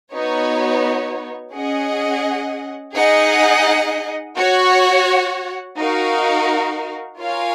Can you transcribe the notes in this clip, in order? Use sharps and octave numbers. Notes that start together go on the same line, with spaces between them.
B3 D#4 F#4 C#5
C#4 G#4 D#5 F#5
D#4 G#4 D#5 F#5
F#4 C#5 F#5
D#4 F#4 A#4 F5
F4 A#4 C#5 F5 G#5